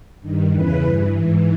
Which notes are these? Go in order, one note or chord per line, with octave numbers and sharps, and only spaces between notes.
G2 D#3
E2 C#3 E3 B4
G2 E3
G#2 E3